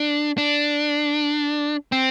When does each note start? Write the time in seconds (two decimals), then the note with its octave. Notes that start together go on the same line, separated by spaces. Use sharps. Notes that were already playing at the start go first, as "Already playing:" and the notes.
Already playing: D4
0.38 D4
1.92 C4